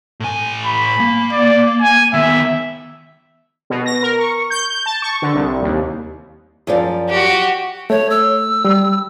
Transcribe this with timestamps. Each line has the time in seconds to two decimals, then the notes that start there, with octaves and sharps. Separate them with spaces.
0.20 A2 G#5
0.65 B5
1.00 A#3
1.32 D5
1.81 G#5
2.14 D#3 B3 E5
3.70 B2
3.86 A#6
4.02 A#4
4.19 C#6
4.50 G6
4.70 G6
4.86 A5
5.02 C#6
5.22 D3
5.35 C2
5.63 D#2
6.67 F#2 F3 D5
7.09 F#4 G4
7.90 A3 C#5
8.10 E6
8.65 G3